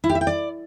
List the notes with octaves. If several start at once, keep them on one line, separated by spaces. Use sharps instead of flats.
E4
G4
E5
G5
D5